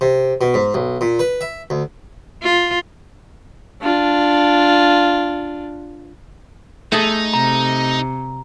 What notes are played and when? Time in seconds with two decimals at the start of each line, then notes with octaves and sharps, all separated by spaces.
0.01 C3
0.41 B2
0.54 G#2
0.74 B1
1.01 A#2
1.19 B4
1.41 E5
1.70 D2
2.43 F4
3.82 D4 F4
6.92 A3 D#4 G#4 A4
7.34 C3 A#5